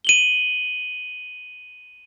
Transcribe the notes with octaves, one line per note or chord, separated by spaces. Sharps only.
D#7 F#7 G7